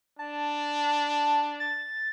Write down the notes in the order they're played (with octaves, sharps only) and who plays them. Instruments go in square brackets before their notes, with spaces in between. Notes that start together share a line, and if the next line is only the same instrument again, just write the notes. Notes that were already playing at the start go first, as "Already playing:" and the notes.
[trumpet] D4 [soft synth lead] A5
[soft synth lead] A6